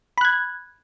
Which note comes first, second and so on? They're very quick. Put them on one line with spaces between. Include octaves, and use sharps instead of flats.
B5 F#6 G#6